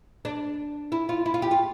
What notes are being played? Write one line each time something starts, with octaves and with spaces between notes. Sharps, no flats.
D4
E4
F4
E4
F4
G4
F4